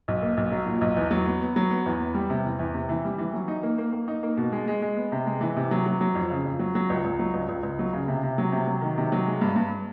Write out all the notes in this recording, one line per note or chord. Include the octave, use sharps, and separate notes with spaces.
B1
A#3
B1
F#3
A#2
B1
E2
F#3
B3
B3
F#3
B3
E2
B3
G3
C3
E2
E2
C3
E3
G3
E3
F#3
D#4
A#3
A#3
A#3
D#4
A#3
B2
G#3
G#3
G#3
B3
C3
G#3
E3
C3
F#3
F#3
F#3
F2
C#3
F2
F#3
F#3
C#2
C#2
F#3
C#2
C#2
C#2
F#3
C#3
C3
C3
F#3
C3
F#3
D#3
C3
F#3
G#3
G2
G2